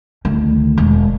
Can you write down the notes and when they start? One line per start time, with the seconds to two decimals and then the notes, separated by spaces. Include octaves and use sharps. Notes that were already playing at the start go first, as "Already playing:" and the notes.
0.25 D2 D#3
0.78 E1